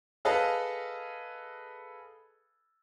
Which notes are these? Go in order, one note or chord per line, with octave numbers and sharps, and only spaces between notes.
G#4 A4 B4 D#5 F5 A5